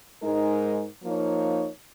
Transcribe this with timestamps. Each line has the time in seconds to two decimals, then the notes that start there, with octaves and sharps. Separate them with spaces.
0.21 G#2 G#3 D#4 A#4
1.03 F3 A#3 D#4 C#5